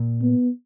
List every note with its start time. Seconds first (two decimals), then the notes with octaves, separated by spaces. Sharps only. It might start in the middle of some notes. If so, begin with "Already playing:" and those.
Already playing: A#2
0.22 B3